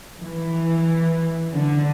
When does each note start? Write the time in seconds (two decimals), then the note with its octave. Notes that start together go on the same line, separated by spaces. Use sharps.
0.20 E3
1.54 D3